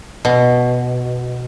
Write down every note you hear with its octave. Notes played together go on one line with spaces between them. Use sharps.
B2